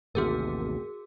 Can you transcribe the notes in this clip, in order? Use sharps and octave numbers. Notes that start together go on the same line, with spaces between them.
A1 D#2 C3 F#4 G#4 A#4